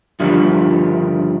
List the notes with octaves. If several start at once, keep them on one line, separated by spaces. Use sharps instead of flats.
G2 D3 D#3 F3 G3